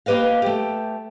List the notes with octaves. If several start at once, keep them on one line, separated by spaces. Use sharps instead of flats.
A#3 G4 B4 D#5 F5
A3 G4